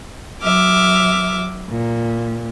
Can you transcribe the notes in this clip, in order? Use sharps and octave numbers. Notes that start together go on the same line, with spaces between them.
F#3 E5 D6 F6
A#2